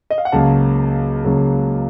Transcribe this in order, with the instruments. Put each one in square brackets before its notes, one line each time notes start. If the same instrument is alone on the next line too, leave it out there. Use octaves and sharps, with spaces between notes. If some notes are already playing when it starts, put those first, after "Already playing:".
[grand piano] D#5
F5
F#5
C#2 C#3 F#3 A#3 F5 A5
C#2 C#3 F#3 A#3